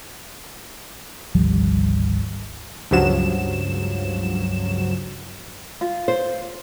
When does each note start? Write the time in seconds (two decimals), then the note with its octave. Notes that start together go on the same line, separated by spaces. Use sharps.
1.35 G#1 D2 F3 G3
2.91 C#2 G2 F3 F#3 E7
5.81 F4
6.08 C5